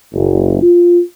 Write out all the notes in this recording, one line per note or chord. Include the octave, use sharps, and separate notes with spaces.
F#1
F4